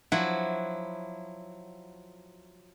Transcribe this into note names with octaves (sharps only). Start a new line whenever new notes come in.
F3 F#3 E4 F#5